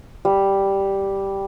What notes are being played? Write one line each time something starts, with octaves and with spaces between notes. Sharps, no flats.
G3